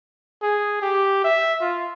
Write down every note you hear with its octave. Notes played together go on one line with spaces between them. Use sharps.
G#4
G4
E5
F4